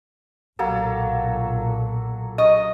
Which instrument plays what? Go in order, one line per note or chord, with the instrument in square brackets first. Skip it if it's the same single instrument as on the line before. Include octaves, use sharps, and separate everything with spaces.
[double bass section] B1 A#2 [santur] F#3 A#3 A4
[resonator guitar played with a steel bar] D#5 [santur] C#6